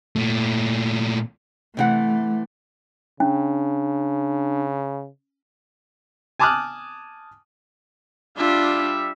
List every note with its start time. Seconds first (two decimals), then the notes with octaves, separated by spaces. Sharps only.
0.16 A#2 A3
1.77 C3 E3 A3 F#5
3.20 C#3 C#4 D4
6.40 G#5 A5 D6 D#6 F6 F#6
8.37 G3 D4 F4 E5